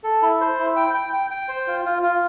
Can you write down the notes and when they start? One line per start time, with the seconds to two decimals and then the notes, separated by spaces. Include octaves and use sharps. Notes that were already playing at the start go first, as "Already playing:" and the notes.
0.04 A4
0.22 E4
0.41 C5
0.59 E4
0.76 G5
0.94 G5
1.13 G5
1.31 G5
1.49 C5
1.67 F4
1.86 F4
2.03 F4